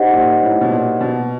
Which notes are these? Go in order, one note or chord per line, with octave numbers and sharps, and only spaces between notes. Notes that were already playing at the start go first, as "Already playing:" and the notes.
Already playing: D#4 G4 C5 D#5 F#5
A#2
A2
B2
A#2
B2